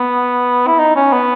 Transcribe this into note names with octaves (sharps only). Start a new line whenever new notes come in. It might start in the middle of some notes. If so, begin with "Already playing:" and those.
Already playing: B3
E4
D#4
C#4
B3